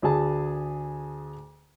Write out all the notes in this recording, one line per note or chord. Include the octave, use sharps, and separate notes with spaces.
D2 G#4 A5